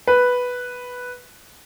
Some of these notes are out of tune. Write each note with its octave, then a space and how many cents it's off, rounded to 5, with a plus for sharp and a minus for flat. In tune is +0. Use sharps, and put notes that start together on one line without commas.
B4 +0